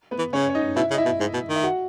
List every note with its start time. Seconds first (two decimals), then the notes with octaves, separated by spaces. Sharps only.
0.11 B3 B4
0.19 E3
0.33 C#3 C#4 C#5
0.50 C#5
0.55 D#4 D#5
0.76 B2 E4 E5
0.91 C#3
0.94 D#5
0.98 E4 E5
1.06 B2
1.20 G#2
1.34 B2
1.49 D#3
1.56 E5
1.63 F#4 F#5